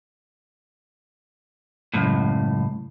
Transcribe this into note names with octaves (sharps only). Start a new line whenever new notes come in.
C#2 F#2 A2